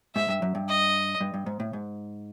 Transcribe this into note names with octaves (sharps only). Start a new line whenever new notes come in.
G#2 E5
G2
F#2
G2
D#5
G2
G2
G#2
A2
G#2